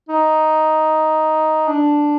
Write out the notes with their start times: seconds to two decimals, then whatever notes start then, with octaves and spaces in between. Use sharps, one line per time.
0.09 D#4
1.67 D4